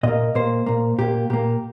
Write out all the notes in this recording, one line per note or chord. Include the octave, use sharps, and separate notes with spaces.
A#2 A#3 D#5
A#2 A#3 C5
A#2 A#3
A#2 A#3 G4
A#2 A#3 G4